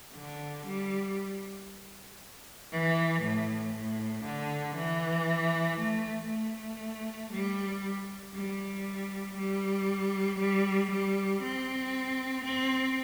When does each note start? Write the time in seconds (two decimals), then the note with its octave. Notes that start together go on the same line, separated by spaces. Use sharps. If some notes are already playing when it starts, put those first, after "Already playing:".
0.15 D3
0.66 G3
2.72 E3
3.22 A2
3.74 A2
4.25 D3
4.76 E3
5.79 A3
6.30 A3
7.33 G3
8.35 G3
9.38 G3
10.40 G3
10.91 G3
11.42 C4
12.45 C4